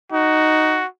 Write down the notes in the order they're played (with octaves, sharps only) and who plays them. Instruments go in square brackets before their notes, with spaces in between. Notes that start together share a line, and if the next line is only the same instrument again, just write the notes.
[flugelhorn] D#4 [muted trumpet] F#4